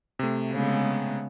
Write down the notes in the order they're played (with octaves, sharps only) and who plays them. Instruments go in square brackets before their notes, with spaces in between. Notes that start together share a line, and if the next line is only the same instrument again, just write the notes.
[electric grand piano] C3 A3
[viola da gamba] C#3 G#3 B3